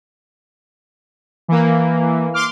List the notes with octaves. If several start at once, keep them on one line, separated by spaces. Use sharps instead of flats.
E3 A#3
C6 D6 F6